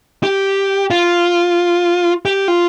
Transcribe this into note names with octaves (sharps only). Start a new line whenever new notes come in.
G4
F4
G4
F4